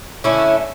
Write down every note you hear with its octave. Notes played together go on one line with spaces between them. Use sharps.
D3 A3 C#4 E4